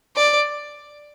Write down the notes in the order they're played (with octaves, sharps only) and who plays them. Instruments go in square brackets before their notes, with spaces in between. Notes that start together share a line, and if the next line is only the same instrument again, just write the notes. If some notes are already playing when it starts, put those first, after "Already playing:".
[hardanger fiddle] D5